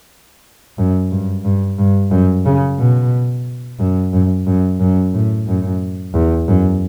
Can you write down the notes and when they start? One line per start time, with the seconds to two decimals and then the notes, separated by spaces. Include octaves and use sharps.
0.78 F#2
1.11 G2
1.45 G2
1.78 G2
2.11 F#2
2.45 C#3
2.78 B2
3.79 F#2
4.13 F#2
4.47 F#2
4.80 F#2
5.13 A2
5.47 F#2
6.14 E2
6.48 F#2